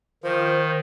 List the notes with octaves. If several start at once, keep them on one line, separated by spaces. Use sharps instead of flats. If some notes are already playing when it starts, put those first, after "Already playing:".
D#3 F3 C5